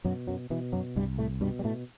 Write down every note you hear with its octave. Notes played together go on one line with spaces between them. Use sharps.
F#2 B2 F#3
F#2 F#3
B2 E3
F#2 F#3
C2 G2 G3
A2 A3
G2 B2 G3
G3
A2 A3